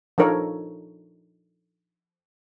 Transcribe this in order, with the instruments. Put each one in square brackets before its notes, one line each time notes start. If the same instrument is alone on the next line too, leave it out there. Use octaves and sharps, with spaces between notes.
[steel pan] F3 D4 D#4 A4 A#4 C#5